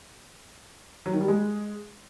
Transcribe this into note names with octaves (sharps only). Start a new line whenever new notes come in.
F#3
D#3
G3
G#3